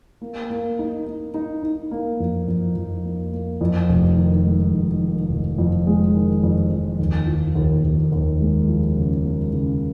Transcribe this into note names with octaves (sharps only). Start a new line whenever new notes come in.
A#3
A#3
D#4
D#4
D#4
D#4
A#3
F2
F2
F2
A#3
A#3
F2
F1
D#3
G#3
F2
D#3
F1
F2
G#3
D#3
F2
F2
D#2
F3
D#2
D#2
D#2
G#3
F3
C#3
G#3
C#3